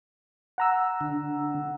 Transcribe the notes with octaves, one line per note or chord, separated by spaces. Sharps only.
F#5 A#5 E6
D3 D4